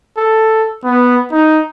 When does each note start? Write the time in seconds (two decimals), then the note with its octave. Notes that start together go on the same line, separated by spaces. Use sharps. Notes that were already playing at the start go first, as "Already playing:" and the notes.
0.17 A4
0.84 B3
1.32 D#4